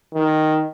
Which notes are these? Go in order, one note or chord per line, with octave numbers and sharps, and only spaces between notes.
D#3